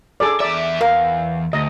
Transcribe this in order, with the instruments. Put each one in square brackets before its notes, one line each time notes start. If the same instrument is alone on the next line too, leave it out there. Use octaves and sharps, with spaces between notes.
[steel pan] G#4 A4 D5
[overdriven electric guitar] E2 E5 [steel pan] D5
[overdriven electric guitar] E2 [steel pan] A#4 [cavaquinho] F5
[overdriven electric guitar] D2 [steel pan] D#5